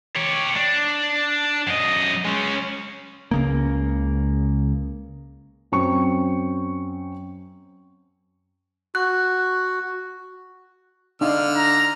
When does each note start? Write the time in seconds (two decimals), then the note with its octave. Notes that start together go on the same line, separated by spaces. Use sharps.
0.15 G4 C#5
0.56 D4
1.67 F#2 D#5
2.25 G#3 C#4
3.31 C#2 C#3 A#3
5.72 F#2 C4 C#6
8.95 F#4 F#6
11.21 D3 D4 D#4 F5 F6
11.56 A#5